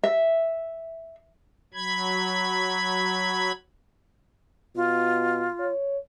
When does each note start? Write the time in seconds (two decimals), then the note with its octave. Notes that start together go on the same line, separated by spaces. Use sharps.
0.03 E5
1.74 F#3 B5 G#6
4.76 B2 F4
5.60 C#5